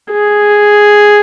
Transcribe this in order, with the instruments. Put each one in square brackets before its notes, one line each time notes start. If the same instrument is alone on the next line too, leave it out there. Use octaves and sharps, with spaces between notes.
[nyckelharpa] G#4